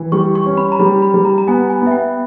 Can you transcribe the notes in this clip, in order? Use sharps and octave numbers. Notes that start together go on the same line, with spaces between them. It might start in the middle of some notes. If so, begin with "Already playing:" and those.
Already playing: E3
G3 C#6
C#6
C#4
B5
A#5
G3 B5
B5
G3
A#5
A#5
B3 G#5
G#5
B3
E5
G5